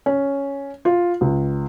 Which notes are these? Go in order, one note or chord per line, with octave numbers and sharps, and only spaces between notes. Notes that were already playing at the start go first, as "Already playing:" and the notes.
C#4
F4
C#2